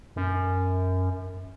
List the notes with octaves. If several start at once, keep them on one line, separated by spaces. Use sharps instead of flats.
F#2